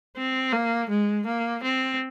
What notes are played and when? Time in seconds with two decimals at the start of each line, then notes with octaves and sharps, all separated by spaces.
0.17 C4
0.53 A#3
0.90 G#3
1.27 A#3
1.63 C4